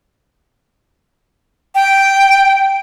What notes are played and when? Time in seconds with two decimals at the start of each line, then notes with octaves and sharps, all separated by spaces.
1.75 G5